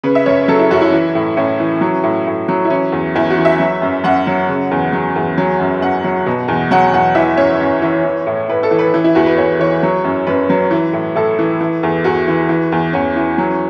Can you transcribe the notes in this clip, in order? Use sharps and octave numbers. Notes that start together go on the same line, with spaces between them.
C#3 B4
E5
F#2 C#5
F#3 A4
E4
F#2 F#4
E4
E3
A2
A2 C#4
E3
F#3
A2
A2
F#3
E4
E3 C#4
E2
E2 E4
F#4
E3
E5
F#3
F#2
F#2 F#5
F#3
C#3
E2
F#3
E2
F#3
F#2
F#2 F#5
F#3
B2
E2
F#3 F#5
E2 F#5
E3 E5
F#2 C#5
F#2
E3
E3
A2
A2 B4
A4
E3
B4
E3
E4
E2 F#4
B4
E2 C#5
E3 C#5
F#3
F#2
F#2 B4
F#3
E3
A2
A2 A4
E3
E3
E2
E2 F#4
E3
E3
E2
E2 C#4
E3
F#3